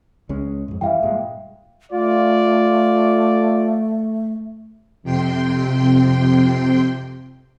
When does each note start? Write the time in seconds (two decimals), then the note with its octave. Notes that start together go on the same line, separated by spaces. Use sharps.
0.29 C#2 G#3 C#4
0.68 F2 G#2
0.81 G2 E3 G3 E5 F5 G5
1.03 G2 A#2 G#3
1.92 A3 F4 D5
5.03 F2 C3 G5 C6